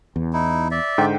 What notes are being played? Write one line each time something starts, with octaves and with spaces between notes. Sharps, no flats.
E2
D#4 E4
D5 E5
G#2 D3 G5